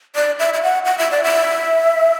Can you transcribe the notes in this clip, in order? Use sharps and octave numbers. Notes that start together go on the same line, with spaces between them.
D5
E5
E5
F#5
F#5
E5
D5
E5